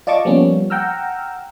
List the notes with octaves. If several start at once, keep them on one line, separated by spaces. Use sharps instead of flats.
F4 D5 D#5 A5 C#6 D6
F3 G3 A#3 B3 C#4
F#5 G5 A#5 E6 F6